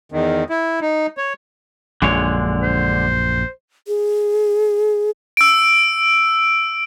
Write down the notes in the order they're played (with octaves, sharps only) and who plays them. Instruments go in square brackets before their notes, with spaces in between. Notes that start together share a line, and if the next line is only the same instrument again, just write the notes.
[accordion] E2 D#3
E4
D#4
C#5
[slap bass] A#1 F#2 [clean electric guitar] D3 G#3 C#5
[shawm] C5
[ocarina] G#4
[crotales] E6 D7